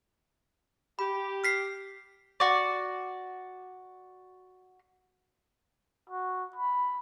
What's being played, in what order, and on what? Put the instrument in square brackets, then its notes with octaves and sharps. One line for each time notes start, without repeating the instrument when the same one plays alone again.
[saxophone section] G4 [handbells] B5
[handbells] F6 B6 C7
[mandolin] F#4 D5
[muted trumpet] F#4
B5